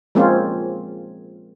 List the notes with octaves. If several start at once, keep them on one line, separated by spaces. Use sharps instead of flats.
F3 G#3 A#3 C4 C#4 F4